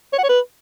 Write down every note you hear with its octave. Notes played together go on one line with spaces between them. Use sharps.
C#5
F#5
C#5
B4